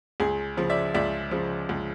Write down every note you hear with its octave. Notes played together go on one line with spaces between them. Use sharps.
C#2 G#4
C#3 F3
D5 E5
C#2 D5 E5
C#3 F3
C#2